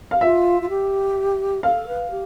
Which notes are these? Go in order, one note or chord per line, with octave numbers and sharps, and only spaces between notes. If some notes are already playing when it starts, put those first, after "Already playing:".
F5
F4 E5
F4
G4
A4 F5
B4
G4